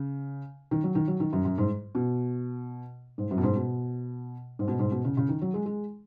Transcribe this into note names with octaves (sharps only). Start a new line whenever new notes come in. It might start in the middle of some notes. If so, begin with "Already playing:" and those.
Already playing: C#3
D#3
F#3
D#3
F#3
D#3
F#2
F#2
G#2
B2
G#2
F#2
B2
G#2
B2
G#2
B2
G#2
B2
C#3
C#3
D#3
F#3
G#3
G#3